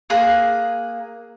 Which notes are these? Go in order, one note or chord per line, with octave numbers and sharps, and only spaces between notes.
A#3 G#4 F#6